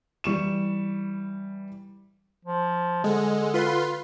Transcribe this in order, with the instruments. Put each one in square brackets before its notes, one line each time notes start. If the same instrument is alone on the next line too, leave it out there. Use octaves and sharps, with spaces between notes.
[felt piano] E3 G3 C#6 E7
[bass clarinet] F3
[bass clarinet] D3 [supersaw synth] G#3
[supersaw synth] F4 B4 C6